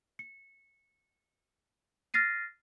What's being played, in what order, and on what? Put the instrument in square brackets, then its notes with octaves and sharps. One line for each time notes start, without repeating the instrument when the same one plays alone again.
[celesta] C#7
F6 A6 A#6 C7 D#7